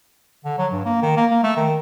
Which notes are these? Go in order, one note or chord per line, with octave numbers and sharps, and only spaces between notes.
D3
F#3
G2
A#3
D#3
A#3
A#3
A3
D#3